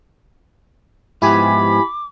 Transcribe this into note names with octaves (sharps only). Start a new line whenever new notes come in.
G#2 F3 B3 E4 G4 G#5 B5 D6